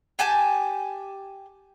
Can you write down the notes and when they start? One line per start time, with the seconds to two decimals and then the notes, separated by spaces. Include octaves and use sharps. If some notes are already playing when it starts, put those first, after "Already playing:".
0.19 G4 G#5 A5 G6